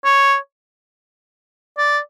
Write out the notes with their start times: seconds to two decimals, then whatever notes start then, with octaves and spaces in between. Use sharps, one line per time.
0.05 C#5
1.78 D5